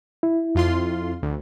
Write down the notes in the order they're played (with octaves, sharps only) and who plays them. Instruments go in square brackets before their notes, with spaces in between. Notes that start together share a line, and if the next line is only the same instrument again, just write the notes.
[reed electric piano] E4
[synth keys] F2 F4 C6
D2